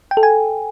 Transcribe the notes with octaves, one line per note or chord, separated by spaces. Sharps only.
G5
A4
G#5